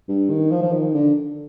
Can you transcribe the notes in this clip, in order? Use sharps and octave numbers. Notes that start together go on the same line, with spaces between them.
G2
D#3
F3
F3
D#3
D3